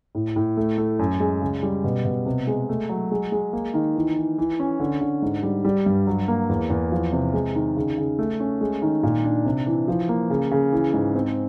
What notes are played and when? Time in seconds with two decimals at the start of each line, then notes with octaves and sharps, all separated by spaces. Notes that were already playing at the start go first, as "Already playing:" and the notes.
0.15 A2
0.36 A2
0.57 A3
0.78 A3
0.99 F#2
1.20 G#3
1.42 C#3
1.63 G3
1.84 B2
2.05 B2
2.26 C3
2.47 G#3
2.69 A3
2.89 F#3
3.12 G#3
3.32 G#3
3.53 A#3
3.74 D#3
3.96 E3
4.17 E3
4.38 E3
4.60 C#4
4.80 D3
5.01 D3
5.22 G#2
5.43 G3
5.65 G3
5.86 G2
6.07 F#3
6.28 A#3
6.49 E2
6.70 E2
6.92 F3
7.13 C3
7.33 G#3
7.55 D#3
7.76 C#3
7.98 C#3
8.19 A3
8.40 C#4
8.61 G#3
8.82 D#3
9.03 A#2
9.24 D4
9.45 C3
9.67 E3
9.88 F3
10.09 A#3
10.30 C#3
10.51 C#3
10.72 E3
10.93 G#2
11.15 C4